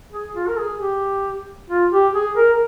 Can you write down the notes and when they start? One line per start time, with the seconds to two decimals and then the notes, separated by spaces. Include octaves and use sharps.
0.12 G#4
0.36 F4
0.48 A#4
0.58 G#4
0.80 G4
1.70 F4
1.93 G4
2.15 G#4
2.37 A#4